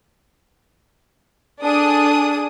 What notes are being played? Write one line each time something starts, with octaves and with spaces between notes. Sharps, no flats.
D4 G#4 A4 D#6